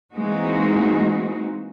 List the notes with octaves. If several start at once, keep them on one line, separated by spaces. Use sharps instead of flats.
E3 G#3 A#3 C4 D#4 F#4